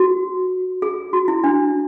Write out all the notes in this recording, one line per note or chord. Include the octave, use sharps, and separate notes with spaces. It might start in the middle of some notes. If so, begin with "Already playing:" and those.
Already playing: F#4
G#4
F#4
E4
D4